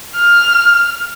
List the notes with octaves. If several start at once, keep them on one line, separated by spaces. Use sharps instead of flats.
F6